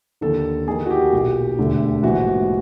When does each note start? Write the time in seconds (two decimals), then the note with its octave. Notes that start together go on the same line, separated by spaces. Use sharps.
0.21 D#2 D3 A4
0.67 D#2 D#3 G#4
0.86 F#4
0.90 G4
1.13 B1 A#2
1.59 E1 D2 D3
2.03 A#1 G#2 E3 F#4